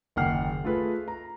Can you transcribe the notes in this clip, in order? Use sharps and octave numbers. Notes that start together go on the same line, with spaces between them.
F#1 D#2 F#5 G5 F6 C7
A3 F4 G#4 A4 B4
A#5